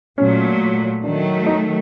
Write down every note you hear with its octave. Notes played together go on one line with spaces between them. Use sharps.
A#2 F#3 A3 C#4
D#3 F#3 A3 D4
D#4